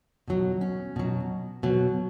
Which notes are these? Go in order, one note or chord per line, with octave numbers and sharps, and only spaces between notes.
B2 F#3
C#4
B2 F#3
B2 F#3